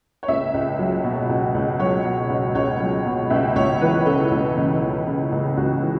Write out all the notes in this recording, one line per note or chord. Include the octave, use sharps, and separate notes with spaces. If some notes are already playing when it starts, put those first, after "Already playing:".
C#5
C#2 E5
C#2
F#3
B2
C#2
C#2
F#3 C#5
B2
C#2
C#2 C#5
F#3
B2
C#2 E5
C#2 C#5
E3 B4
C#3 A4
C#2
C#2
E3
C#3
C#2
C#2 F#4
E3